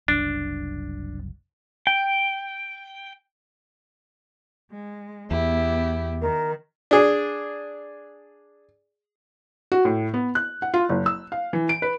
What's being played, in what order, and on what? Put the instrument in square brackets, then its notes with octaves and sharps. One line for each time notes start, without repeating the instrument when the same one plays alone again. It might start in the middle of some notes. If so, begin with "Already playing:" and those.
[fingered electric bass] F#1 C2 F#2 [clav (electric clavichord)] D4
[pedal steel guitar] G5
[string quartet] G#3
[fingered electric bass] E2 [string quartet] B3 E4 G4
[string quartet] D#3 [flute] A#4
[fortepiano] D4 G#4
[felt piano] F#4
A2
B3
F#6
F#5
F4
F#1
E6
F5
E3
D7
B4